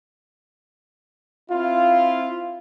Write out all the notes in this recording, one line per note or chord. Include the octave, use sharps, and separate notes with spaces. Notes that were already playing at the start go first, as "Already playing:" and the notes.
C4 E4 F4